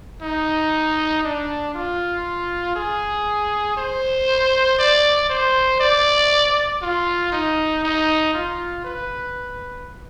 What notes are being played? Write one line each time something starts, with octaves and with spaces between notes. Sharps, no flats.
D#4
D4
F4
G#4
C5
D5
C5
D5
F4
D#4
D#4
F4
B4